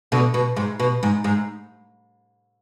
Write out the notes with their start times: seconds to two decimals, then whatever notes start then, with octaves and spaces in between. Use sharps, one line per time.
0.12 B2 D3
0.34 B2
0.57 G#2
0.80 B2
1.03 G#2
1.24 G#2